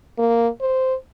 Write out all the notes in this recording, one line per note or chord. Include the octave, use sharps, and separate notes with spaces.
A#3
C5